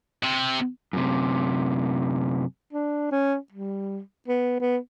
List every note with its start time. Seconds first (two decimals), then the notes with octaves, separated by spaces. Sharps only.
0.24 C3
0.93 F#2 C3
2.73 D4
3.12 C#4
3.52 G3
4.28 B3
4.60 B3